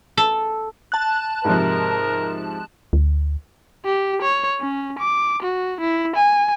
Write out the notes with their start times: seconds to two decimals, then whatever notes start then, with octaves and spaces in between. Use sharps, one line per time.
0.17 A4
0.92 A5 F#6
1.45 G#2 C3 F3 A#4
2.93 D2
3.85 G4
4.22 C#5
4.60 C#4
4.99 D6
5.43 F#4
5.81 E4
6.16 G#5